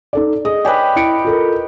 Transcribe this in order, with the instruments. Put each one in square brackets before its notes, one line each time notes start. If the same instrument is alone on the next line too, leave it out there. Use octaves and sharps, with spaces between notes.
[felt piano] D#4 A4 D5
[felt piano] G#4 [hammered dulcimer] D#5
[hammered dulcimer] G4 B4 [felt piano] C#5 D5 G#5
[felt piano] E4 C#7 D7
F4 A4 A#4